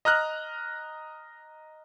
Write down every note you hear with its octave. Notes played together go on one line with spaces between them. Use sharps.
D#5 A#5 F6 F#6